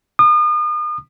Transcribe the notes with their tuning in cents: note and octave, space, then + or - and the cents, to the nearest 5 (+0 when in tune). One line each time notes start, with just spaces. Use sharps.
D#6 -40